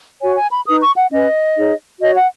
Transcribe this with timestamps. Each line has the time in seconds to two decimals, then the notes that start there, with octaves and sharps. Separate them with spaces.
0.20 F#4 C#5 G#5
0.36 G#5
0.51 B5
0.65 D#4 B4 D#6
0.81 C#6
0.95 F#5
1.10 C#4 B4 D#5
1.56 D#4 G#4 C#5
2.00 F#4 C#5 D#5
2.15 F#5